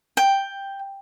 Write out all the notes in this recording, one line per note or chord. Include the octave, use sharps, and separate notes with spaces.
G5